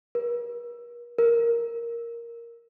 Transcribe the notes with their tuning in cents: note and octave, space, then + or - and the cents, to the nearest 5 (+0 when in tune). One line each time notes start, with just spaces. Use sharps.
A#4 +45
A#4 +0